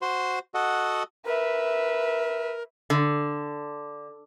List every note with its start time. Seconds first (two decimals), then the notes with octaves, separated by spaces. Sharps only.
0.02 F#4 C5 C6
0.54 F#4 A4 D#5 F#5
1.25 A#4 B4 E5
2.90 D3